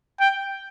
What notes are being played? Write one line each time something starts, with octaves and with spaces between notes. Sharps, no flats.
G5